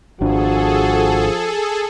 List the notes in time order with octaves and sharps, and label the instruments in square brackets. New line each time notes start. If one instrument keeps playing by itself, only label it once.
[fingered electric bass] G#1 D4 [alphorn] F3 [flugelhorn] F#4 [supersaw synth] G#4 A4